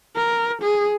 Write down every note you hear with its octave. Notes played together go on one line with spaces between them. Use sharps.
A#4
G#4